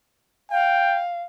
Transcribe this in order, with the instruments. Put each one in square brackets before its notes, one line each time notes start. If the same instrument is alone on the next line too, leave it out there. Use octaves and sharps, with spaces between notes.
[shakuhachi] F5 [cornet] G5